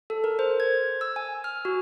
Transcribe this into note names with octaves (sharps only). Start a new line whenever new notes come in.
A4
A#4
C5
G#6
E6
G#5
F6
F#4